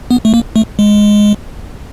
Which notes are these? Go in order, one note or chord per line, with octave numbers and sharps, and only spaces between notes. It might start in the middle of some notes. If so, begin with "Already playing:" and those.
B3
A3
A#3
A3
G#3